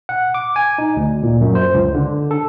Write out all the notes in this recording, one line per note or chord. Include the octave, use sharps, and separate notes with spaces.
F#5
D6
G#5
D#4
D2
A#2
F#2
C5
C#2
D3
A4